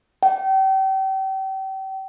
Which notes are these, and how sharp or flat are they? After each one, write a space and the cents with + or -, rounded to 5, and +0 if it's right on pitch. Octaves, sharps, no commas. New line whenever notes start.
G5 -35